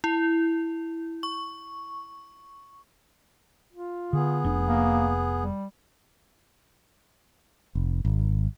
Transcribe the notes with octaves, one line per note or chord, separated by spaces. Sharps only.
E4
C#6
F4
D3 B3 G#4
F1 D4
A#3
G3
F1
G#1